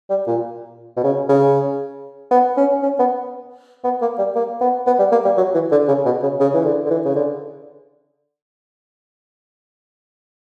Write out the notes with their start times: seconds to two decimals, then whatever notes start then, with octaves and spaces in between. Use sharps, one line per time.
0.10 G3
0.27 A#2
0.97 B2
1.04 C#3
1.29 C#3
2.31 B3
2.57 C#4
2.83 C#4
2.99 B3
3.84 B3
4.02 A#3
4.18 G3
4.35 A#3
4.61 B3
4.87 B3
4.99 G3
5.12 A#3
5.25 G3
5.37 F#3
5.54 E3
5.72 D3
5.88 C#3
6.05 B2
6.23 C#3
6.40 C#3
6.54 E3
6.65 D3
6.86 D3
6.91 E3
7.05 C#3
7.16 D3